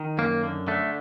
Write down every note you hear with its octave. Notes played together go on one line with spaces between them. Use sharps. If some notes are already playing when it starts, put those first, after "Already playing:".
Already playing: D#3
F#2 A#3
D3
D3 A3